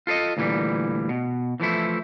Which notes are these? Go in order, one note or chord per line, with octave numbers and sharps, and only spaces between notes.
F4 A4 C5 D#5
D2 A#2 E3 G3
B2
E3 F3 A3 E4